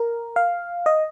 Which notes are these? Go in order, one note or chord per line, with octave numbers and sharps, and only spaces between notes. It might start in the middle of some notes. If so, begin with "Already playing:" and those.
Already playing: A#4
F5
D#5